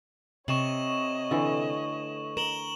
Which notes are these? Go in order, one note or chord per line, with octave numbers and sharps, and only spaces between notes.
C3 C#5 D#5 C#6 E7 F#7
D3 E3 A3
A#4 E7 F#7 G7